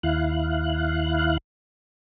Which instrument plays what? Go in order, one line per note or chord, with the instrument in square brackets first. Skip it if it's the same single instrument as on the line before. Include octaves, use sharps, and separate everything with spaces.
[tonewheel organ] D#2 E4 F5 F#6